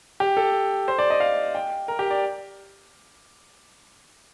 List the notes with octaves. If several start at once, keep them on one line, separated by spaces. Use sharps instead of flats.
G4
A4
C5
D5
D#5
F5
G5
A#4
G4
D5